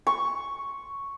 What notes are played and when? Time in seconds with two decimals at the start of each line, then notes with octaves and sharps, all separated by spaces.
0.07 C#6